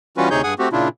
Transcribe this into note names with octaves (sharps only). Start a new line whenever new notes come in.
E3 G3 C#4 F4 F#4 B4
D2 C3 D#4 G#4 C#5 G6
G2 G#4 F#5 G#5 D#6
A3 C4 F#4 G4
A#2 C#3 D4 E4 F4